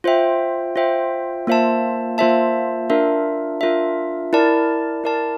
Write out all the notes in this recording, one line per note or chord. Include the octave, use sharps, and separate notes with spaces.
F4 C5 E5 G5
F4 C5 E5 G5
A#3 F4 C5 E5 A5
A#3 F4 C5 E5 A5
D4 F4 A#4 E5
D4 F4 A#4 E5
E4 A#4 D5 A5
E4 A#4 D5 A5